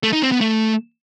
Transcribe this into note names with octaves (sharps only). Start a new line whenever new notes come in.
A3
D#4
C4
B3
A3